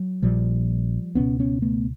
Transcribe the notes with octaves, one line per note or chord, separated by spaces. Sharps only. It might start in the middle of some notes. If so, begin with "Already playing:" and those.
Already playing: F#3
A#1 A#2 F3 G3
C#2 B2 B3 C#4
B3 C#4
A3 B3